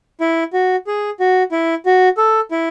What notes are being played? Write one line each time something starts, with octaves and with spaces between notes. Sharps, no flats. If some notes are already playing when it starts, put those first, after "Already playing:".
E4
F#4
G#4
F#4
E4
F#4
A4
E4